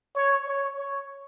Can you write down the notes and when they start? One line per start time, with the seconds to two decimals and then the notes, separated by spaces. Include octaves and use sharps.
0.15 C#5
0.46 C#5
0.77 C#5